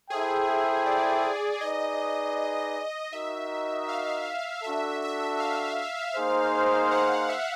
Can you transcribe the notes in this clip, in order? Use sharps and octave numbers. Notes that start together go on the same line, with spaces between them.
E4 G#4 A4 C5 E5 G5
D5
D#4 G#4 B4 D5 D#5
D#4 F#4 A#4 D#5 E5
F5
D4 F#4 A4 E5
E5
F5
A#3 D#4 G#4 C5
F#5
F5
E5